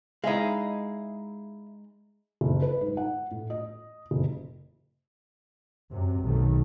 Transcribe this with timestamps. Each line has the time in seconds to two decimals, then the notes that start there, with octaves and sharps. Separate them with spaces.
0.24 G#3 D#4 E4 E5 F5
2.41 F#1
2.62 B4
2.81 G#2
2.97 F#5
3.31 A2
3.50 D#5
4.11 F#1
5.92 F#2 C3
6.22 B1 D#3 A3